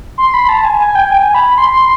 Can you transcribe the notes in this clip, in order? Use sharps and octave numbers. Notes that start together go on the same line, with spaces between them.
C6
B5
A5
G#5
G#5
G5
G#5
B5
C6
C6